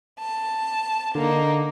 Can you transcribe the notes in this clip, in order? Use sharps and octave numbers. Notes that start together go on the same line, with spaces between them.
A5
D3 A#3 D#4